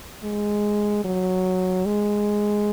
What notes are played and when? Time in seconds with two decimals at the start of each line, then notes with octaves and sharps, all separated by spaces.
0.24 G#3
1.04 F#3
1.85 G#3